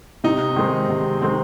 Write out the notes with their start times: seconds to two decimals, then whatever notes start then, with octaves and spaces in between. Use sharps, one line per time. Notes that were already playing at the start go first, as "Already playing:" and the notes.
0.24 C3 D#4
0.56 D#3 G#3 C4
0.89 C3
1.22 D#3 G#3 C4